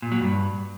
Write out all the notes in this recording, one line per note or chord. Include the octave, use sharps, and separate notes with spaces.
A#2
F#3
G2